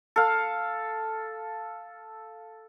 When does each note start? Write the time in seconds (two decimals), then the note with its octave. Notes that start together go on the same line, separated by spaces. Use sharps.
0.16 A4 F5